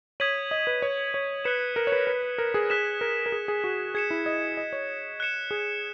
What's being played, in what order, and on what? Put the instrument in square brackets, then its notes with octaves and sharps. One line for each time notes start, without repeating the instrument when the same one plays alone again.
[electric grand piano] C#5 [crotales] D#6 G#6 B6 D#7 F#7
[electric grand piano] D#5
B4
C#5
C#5
[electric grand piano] B4 [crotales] F#6 C#7 E7
[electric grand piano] A#4
C#5
B4
B4
A#4
G#4
[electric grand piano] G#4 [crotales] F#6 B6 E7
[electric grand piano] A#4
A#4
G#4
G#4
F#4
[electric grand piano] G#4 [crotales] G#6 C#7 E7
[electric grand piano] E4
D#5
D#5
C#5
[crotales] F#6 C#7 E7
[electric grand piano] G#4